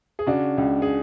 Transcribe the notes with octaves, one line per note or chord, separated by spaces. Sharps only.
G#4
C#3 D4 F#4
C#2
G#4